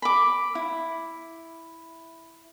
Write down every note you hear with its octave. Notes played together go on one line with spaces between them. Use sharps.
B5 D6
E4